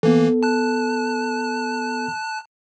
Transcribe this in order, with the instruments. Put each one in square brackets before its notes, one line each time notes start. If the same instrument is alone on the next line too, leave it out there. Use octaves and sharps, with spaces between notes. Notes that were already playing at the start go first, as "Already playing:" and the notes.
[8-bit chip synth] E3 A#3 [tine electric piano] B3 A4
[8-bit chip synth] A5 F#6